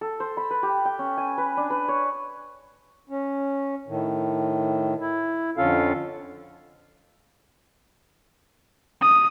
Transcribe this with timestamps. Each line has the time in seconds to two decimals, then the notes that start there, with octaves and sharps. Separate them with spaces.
0.01 A4
0.20 C5
0.37 B5
0.51 B4
0.63 G4
0.85 G5
0.99 C#4
1.18 G#5
1.38 B4
1.57 D4
1.70 B4
1.88 C#5
3.09 C#4
3.88 A2 D#3
5.01 E4
5.57 F2 D3 C#4 F4 A4 F5
9.01 D#6